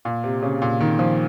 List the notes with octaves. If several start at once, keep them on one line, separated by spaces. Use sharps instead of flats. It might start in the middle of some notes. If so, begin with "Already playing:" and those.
A#2
C3
C#3
A#2
D#3
F3